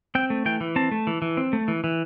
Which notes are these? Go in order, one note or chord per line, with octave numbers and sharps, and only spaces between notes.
C4 G5
A3
E3 G5
E3
C4 A5
A3
E3
E3
C4
A3
E3
E3